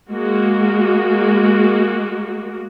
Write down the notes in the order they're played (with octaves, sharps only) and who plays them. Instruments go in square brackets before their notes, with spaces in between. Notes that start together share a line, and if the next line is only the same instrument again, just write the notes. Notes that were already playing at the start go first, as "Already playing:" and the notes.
[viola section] G#3 A#3 F#4